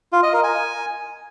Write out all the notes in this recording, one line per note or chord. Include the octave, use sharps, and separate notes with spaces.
F4
D#5
A#4
G#5